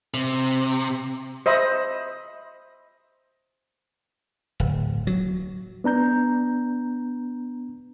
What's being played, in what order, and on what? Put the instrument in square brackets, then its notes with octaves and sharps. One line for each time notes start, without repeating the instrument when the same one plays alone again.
[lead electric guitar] C3
[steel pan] C5 D#5 E5 B5
[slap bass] D1
F#3
[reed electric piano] B3 D4 A#5 G6